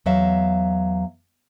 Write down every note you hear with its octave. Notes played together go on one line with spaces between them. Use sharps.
E2 F#3 E5 F5